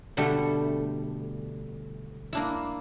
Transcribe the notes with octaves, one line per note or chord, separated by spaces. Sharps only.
B2 D3 G3 A3
A#3 D4 E4